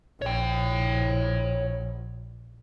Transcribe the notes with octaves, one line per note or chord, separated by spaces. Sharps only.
A#1 C#5 G5